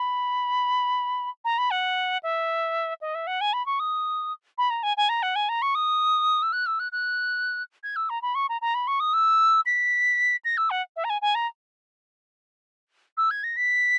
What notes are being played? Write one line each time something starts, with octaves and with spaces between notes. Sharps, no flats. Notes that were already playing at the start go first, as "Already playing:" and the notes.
Already playing: B5
A#5
B5
F#5
E5
D#5
E5
F#5
G#5
B5
C#6
D#6
B5
A#5
G#5
G#5
A#5
F#5
G#5
A#5
C#6
D#6
E6
F#6
E6
F#6
F#6
G#6
E6
A#5
B5
C#6
A#5
A#5
B5
C#6
D#6
E6
B6
A#6
E6
F#5
E5
A#5
G#5
G#5
A#5
E6
G#6
A#6
B6